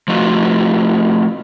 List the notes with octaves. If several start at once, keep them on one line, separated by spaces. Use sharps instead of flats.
F3 A3 D#4 F4 F#4